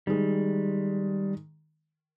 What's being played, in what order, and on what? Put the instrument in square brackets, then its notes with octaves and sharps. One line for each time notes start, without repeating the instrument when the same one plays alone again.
[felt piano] D#3 G#3 [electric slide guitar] G3